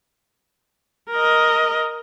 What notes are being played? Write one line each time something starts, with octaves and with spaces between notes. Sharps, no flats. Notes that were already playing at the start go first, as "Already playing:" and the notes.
A#4 D#5